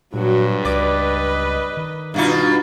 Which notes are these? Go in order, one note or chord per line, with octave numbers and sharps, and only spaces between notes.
G2 A#2 F#3 F#4
C#2 B4 D5 D#5
D#3
G2 B2 D#4 F4 F#4